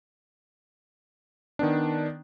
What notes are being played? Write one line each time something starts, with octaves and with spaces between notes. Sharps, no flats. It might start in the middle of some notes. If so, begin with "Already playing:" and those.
D#3 B3 D4